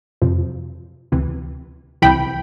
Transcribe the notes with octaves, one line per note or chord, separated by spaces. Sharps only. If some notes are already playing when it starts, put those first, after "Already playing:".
F2 C3 F3
D2 C3 E3
C2 C3 E3 G5 B5